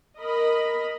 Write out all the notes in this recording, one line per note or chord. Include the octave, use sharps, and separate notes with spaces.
A#4 D#5 B5